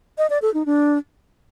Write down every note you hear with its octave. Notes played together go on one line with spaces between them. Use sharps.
D#5
D5
A4
D#4
D4